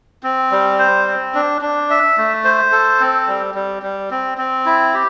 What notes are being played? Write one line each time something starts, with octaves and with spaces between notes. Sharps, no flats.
C4
G3
C5
C4
D4
D4
E5
A3
C5
A4
C4
G3
G3
G3
C4
C4
E4
G4